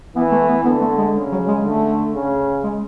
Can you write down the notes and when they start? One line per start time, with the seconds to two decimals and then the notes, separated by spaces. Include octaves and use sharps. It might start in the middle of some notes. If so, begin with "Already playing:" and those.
0.16 E3 B3
0.32 A3
0.48 B3
0.65 D3 B3
0.81 A3
0.98 G#3
1.15 C#3
1.32 F#3
1.48 G#3
1.64 D3 A3
2.14 C#3
2.64 G#3